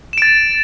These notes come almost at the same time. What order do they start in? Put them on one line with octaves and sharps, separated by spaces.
E7 D7 A6